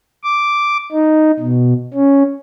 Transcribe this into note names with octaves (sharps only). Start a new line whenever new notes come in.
D6
D#4
B2
C#4